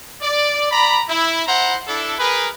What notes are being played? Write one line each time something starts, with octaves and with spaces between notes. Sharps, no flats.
D5
D5 A#5 B5
E4
E4 C5 F#5 A#5
D4 E4 A4
G#4 A#4 B4